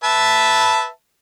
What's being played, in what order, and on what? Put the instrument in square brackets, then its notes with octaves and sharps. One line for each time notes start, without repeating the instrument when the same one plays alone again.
[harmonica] B4 E5 A5